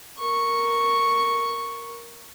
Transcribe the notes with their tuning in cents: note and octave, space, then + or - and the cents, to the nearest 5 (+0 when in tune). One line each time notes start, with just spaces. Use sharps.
A#4 +0 C#6 +0